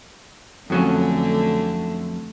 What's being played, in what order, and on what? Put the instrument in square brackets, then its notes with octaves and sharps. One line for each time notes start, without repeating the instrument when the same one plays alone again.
[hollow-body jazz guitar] F2 F#3 C#4 [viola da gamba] D3 A3